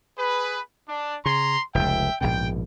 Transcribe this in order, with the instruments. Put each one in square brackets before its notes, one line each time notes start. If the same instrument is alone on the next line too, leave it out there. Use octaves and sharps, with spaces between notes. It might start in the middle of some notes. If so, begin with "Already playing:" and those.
[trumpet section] G#4 B4
D4
[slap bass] C#3 [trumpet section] A#5 C6
[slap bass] F1 C#2 [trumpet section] E5 G5
[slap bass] A#1 G#2 B2 [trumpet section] G5